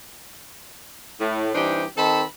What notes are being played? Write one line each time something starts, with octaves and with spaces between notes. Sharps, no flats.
A2
G2 E3 C4 D4 D#4 G4
D#3 C4 D#4 A4 A5 B5